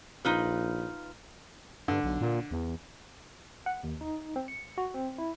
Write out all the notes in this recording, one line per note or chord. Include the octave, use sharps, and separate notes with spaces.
A#1 D#4 F4 B4
G2 D3
B1
A#2
E2
F#5
D#2
D#4
C4
C#7
F#4
C4
E4